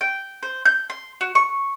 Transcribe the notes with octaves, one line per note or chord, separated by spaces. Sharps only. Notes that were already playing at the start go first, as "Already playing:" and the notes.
G5
C5
G6
C6
F#4
C#6